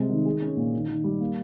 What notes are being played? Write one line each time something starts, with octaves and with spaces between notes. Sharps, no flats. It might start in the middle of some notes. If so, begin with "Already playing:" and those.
Already playing: C3 G3 G#3
D#3
G#4
C#4
A#2
D#3
D#3
G3
A#3